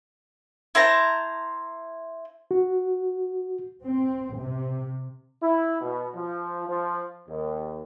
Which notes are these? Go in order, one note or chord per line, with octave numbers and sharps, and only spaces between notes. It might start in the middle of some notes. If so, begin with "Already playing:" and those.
E4 C5 A5 A#5
F#4
C4
C3
E4
B2
F3
F3
D#2